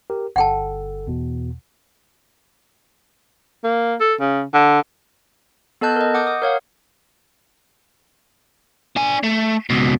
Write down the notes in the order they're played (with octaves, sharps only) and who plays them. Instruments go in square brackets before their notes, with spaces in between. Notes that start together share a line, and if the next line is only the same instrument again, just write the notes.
[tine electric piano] G4 A#4
[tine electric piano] G1 A4 [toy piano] F#5 G5 A5
[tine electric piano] E2 B2
[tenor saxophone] A#3
A4
C#3
D3
[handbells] B3 A4 D#5 A5 F#6 G6
A#4 D#5
F#5 D6 D#6 G6
D#6
A#4 C#5 F5 F#5
[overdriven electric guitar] D4 G#5
A3
C#2 B2